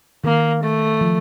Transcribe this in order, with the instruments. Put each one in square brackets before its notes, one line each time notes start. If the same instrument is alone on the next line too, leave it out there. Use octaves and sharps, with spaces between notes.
[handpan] D#3 [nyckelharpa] A#3
[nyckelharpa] A3
[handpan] F3